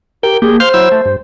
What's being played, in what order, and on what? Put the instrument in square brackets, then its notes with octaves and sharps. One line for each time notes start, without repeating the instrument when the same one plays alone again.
[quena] G4 [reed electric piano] A#4 [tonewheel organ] G5
[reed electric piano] A#3 [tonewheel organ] G4 [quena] G#4
[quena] C5 [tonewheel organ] F5 C6 F6 [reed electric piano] G6
[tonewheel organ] F#3 E4 E6
A3
G2